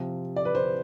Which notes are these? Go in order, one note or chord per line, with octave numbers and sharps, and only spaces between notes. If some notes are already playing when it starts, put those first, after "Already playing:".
Already playing: C3 F3
D5
B4
C5